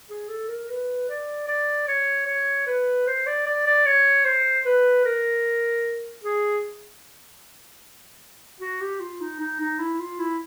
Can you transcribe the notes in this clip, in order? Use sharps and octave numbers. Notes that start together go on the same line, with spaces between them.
G#4
A4
A#4
B4
D5
D5
C#5
C#5
B4
C5
D5
D5
D5
C#5
C5
B4
A#4
G#4
F#4
G4
F4
D#4
D#4
D#4
E4
F4
E4